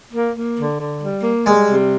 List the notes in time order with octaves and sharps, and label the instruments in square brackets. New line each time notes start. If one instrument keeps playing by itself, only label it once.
[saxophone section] A#3
A#3
D3
D3
G3
A#3
[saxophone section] G3 [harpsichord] G#3
[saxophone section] C3